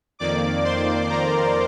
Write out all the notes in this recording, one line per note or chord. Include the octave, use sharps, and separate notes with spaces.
F2 D#3 A#3 D5 D6
C5 C6
A#4 A#5